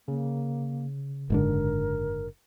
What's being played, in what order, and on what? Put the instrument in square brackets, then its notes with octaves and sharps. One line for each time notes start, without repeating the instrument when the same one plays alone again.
[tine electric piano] C#3 [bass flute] A#3
[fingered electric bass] F#1 G#2 D3 [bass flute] A#4